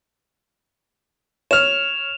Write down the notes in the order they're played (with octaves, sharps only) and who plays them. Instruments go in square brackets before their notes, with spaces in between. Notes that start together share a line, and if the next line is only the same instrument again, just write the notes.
[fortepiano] C#5 F6 [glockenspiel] E7 F7